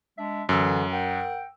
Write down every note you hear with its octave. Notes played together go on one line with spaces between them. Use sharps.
G#3 D4 E5
F#2 D3 E3 E6
A#4 F#5 G5